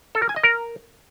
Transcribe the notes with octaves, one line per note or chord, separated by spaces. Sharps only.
A4
A#4
G#5
D#5
A#4